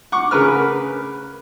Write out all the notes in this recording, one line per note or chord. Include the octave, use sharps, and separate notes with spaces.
F#5 C#6 D6
C#3 A#4 B4 F6